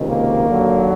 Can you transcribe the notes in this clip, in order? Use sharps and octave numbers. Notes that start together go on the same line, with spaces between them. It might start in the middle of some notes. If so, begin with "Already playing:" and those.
Already playing: C#2 C3 D#3
A#3
D#2 D3 F#3